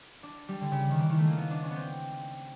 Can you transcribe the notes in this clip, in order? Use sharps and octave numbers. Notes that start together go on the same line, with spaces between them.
D4
G3
D3
C#3
D#3
E3
D#3
A3
A#3
B3
D4
C#4
B3
C4